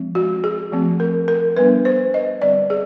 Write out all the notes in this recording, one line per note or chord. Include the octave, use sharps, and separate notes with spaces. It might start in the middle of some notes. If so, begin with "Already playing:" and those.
Already playing: F3 G#3 C4
F#4
G#4
F3 A3 C4
A#4
A#4
G3 B3 D4 B4
C5
D#5
D3 G3 C4 D5
G#4